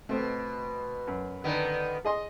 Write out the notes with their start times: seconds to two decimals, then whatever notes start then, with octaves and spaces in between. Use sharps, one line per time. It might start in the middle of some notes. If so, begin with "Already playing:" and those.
0.09 B2 A3 C4
1.07 F#2
1.44 D3 D#3 B3
2.05 G#4 D#5 C6